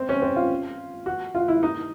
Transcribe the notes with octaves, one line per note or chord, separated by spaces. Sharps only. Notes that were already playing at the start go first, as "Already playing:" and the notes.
Already playing: C4
C#4
C4
F4
F#4
F4
E4
D#4